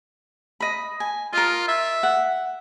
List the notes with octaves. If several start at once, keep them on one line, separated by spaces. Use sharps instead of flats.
D#5 B5
G#5
F4 A#4 D#5
E5
F#5